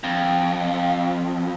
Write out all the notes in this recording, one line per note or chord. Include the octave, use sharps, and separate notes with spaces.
F2